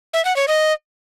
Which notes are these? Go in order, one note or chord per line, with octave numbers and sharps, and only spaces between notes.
E5
F#5
C#5
D#5